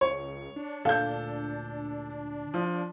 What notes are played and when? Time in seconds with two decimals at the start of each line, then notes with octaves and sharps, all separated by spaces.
0.01 C#2 C#5
0.56 D4
0.85 D2 A#2 A4 F5 G6
2.54 F3